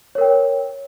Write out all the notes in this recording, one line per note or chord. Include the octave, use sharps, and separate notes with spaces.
A#4 C#5 G5